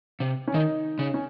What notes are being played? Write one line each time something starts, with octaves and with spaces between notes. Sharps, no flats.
C3
C#4
D#3 D#4
C#3
C#4